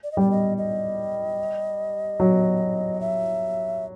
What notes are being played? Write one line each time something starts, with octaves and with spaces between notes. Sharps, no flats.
D5
D#5
G3 D5
D#5
D#5
F#3
E5